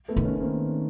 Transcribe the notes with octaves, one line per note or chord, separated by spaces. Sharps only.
A3 B3
D#3
B3 C#4
C#4
A#3 C4